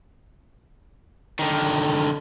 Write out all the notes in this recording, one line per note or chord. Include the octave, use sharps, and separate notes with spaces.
D3 D#3